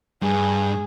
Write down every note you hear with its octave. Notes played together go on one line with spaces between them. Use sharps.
G2 G#4